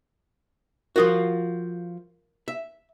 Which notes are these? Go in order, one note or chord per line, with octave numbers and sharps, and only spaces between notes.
F3 F4 F#4 A#4 D#6
E5